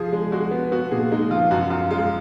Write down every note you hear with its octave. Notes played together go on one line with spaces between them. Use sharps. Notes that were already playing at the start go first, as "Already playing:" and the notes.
Already playing: F3 G#4
G#3
G#3 F#4
B3
B3 F#4
A#2 G#4
G#3 D#4
F3 F4
F#2 F#4
F#2 F4
G#3 F4